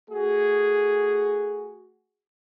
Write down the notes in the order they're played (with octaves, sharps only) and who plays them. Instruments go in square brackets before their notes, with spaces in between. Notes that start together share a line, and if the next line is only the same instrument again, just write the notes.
[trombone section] A3 F#4 G#4